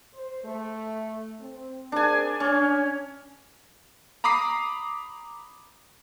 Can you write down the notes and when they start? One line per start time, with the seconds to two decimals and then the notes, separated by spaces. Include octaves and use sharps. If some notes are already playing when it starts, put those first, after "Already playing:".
0.13 C5
0.44 A3
1.40 C4
1.92 C4 D4 G#4 A#4 G#5
2.40 C#4 D4
4.24 A#5 B5 D6 D#6 C7